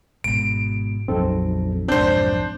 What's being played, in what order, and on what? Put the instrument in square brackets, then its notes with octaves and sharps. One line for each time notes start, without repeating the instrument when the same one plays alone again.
[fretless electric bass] G#1 G#2 B2 [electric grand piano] D7
[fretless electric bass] A#1 F2 F#3 [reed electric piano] C4 D#4 A4
[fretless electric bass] B1 F2 G#2 [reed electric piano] C4 G6 [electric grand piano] D4 C5